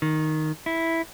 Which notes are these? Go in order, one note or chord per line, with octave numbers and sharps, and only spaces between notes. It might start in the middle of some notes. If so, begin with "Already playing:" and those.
D#3
E4